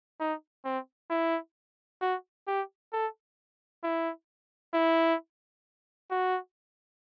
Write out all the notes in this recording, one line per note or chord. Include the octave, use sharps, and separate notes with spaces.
D#4
C4
E4
F#4
G4
A4
E4
E4
F#4